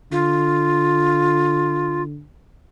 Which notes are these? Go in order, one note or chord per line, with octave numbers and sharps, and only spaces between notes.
D3 F4